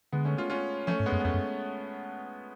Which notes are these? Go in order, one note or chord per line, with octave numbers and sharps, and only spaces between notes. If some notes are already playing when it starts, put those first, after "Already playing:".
D3 G#3 B3
A3 C#4
C#4 F4
C#4 F4
F3 A3 C#4
G#2
G#3 B3
F#2
B3
F2 A3 C#4
F#2